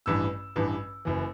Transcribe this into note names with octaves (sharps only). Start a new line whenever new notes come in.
A1 G2 E3 E6
A1 G2 E3
F#1 F#2 E3